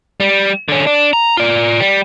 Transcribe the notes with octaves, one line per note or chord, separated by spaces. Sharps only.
G3
D3 C#4
D4
A#5
F4 D5
G3